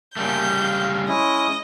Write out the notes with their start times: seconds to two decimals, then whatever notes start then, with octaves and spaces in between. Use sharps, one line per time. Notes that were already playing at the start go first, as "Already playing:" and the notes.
0.16 C#3 G3 A3 A#3 G6
0.62 F5
1.08 G#3 C#4 E4 D#5